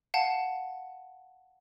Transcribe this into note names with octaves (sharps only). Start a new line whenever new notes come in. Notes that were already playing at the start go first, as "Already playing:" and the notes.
F5 F#5 A5